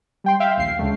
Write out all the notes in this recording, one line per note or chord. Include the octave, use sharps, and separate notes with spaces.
G3 G5 C6
E5 F5 G5
A#1 D#2 C7
D2 C#3 G#3 A3